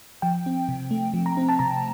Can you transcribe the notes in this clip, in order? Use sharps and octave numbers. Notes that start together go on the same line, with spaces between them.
F3 G5
C4
C3
A3
F3
A#5
C4
A5
C3 A#5